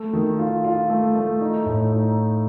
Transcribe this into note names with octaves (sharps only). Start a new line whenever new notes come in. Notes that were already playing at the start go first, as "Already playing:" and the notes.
Already playing: A3
D#3
F4
F4
A3
A3
D#4
A2
D#4